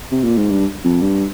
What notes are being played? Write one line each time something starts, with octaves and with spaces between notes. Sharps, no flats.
C3
A#2
G#2
G2
F2
G2